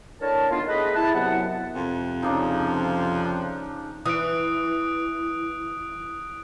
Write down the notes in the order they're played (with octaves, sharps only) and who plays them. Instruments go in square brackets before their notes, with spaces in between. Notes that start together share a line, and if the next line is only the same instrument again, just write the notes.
[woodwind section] A2 D4 A#4 C#5 A5
D#3 A#3 B3 D4 F4
A2 G#4 B4 D#5
E4 A5
F#2 C3 F#3 B3 F#5
[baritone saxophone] F2 [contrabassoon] C3
[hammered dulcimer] C#3 D4 D#4 [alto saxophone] F3
[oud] E3 [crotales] D#6 F#6 D7